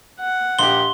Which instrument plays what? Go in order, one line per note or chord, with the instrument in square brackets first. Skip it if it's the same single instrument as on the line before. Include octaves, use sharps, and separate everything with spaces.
[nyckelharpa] F#5
[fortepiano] A#1 G4 [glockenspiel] C6 G7